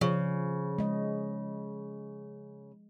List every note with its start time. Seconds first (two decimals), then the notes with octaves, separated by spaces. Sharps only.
0.01 C#3 F3
0.78 G#3 D#5